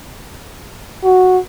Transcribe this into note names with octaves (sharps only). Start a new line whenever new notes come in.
F#4